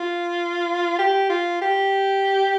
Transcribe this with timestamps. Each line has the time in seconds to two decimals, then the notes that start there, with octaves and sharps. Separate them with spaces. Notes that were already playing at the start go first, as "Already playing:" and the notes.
Already playing: F4
0.98 G4
1.30 F4
1.62 G4